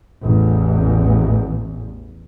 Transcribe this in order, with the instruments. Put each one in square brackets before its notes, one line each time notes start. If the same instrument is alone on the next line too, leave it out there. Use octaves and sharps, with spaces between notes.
[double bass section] A1 E2